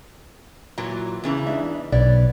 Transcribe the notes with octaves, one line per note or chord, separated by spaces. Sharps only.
A#2 E3 F#3 A#5
E2 C#3 E3
D4 D#4 E5
B1 B3 C#5 D5